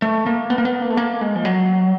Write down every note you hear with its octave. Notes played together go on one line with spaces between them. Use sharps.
A3
A#3
B3
A#3
B3
A#3
A3
A#3
G#3
F3
F#3